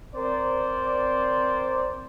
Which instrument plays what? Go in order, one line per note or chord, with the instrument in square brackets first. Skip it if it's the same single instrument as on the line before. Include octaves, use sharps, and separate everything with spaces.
[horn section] C4 A#4 C5 D5